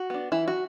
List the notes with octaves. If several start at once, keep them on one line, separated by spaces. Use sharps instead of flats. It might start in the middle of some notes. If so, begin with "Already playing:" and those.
Already playing: F#4
B3 D4
E3 E4
F#4